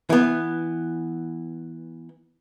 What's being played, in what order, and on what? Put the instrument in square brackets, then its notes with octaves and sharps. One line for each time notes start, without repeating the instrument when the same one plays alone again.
[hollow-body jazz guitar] E3 B3